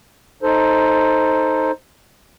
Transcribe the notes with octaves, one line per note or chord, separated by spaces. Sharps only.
D#4 A4 C5